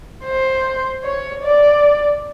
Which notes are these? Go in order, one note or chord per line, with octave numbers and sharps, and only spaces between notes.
C5
C#5
D5